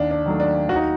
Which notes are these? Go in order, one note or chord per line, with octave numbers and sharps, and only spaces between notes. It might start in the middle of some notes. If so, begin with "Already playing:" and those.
Already playing: D#2 D4
D4
D#3 F#3 A3
D4
D#2 F#4
D#4